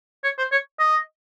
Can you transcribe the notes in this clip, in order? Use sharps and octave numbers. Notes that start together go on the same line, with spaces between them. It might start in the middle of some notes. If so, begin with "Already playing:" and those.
C#5
C5
C#5
D#5